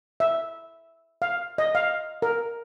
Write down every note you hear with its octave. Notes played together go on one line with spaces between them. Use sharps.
E5
F5
D#5
F5
A#4